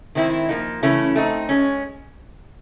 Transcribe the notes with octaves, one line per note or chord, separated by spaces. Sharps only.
D#3 G#3 C4 E4
F3 A#3 D#4
C#3 E3 A3 C#4 E4
A3 C4 D#4
G#3 C#4